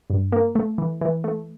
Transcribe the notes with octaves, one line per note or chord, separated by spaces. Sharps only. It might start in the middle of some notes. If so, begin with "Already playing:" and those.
G2
A#3
A3
E3
E3
A3